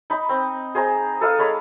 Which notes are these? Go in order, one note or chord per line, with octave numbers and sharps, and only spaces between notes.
D#4 B5
C4
G#4 C5 G#5 A#5
A4 B4 D#5 F5
G#3 C#5 B5